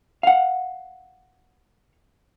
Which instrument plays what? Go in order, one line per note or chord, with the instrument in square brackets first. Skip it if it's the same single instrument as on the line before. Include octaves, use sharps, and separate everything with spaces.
[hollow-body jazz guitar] F5 F#5